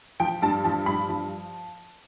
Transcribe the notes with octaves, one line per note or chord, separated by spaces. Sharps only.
F3 G5
G2 A5
F3 A5
G2 B5
F3